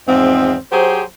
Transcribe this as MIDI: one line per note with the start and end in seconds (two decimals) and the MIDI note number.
0.08 0.54 40
0.08 0.54 44
0.08 0.54 53
0.08 0.54 60
0.72 1.02 54
0.72 1.02 67
0.72 1.02 68
0.72 1.02 72